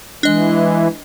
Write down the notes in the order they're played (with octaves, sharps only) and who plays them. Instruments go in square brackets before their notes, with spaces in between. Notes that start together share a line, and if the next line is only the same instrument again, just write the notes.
[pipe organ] E3 [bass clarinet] G#3 [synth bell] D4 D#5